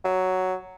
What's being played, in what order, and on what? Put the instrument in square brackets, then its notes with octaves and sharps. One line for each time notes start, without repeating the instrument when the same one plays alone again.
[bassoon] F#3